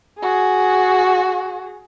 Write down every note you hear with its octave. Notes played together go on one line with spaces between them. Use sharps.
F#4 G#4